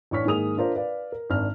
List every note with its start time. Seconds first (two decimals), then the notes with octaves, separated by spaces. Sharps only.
0.11 A1 D4 C#5 C#6 F6 B6
0.25 G#2 D#3 A#3 G#4 D#6 F7
0.57 D4 F4 A#4 C5
0.75 B4 D5 F5
1.12 A#4
1.30 G#1 D4 F6